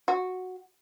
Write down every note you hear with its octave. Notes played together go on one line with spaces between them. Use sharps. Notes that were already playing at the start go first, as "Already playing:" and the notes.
F#4